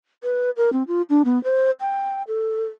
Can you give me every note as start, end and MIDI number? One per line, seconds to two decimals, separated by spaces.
0.23 0.50 71
0.57 0.72 70
0.72 0.83 60
0.87 1.02 65
1.10 1.22 62
1.25 1.42 59
1.44 1.71 72
1.80 2.22 79
2.27 2.65 69